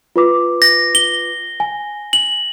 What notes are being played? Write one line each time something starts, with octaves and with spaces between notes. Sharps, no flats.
F4 B4 D6
A#6
G7
G#5
F#7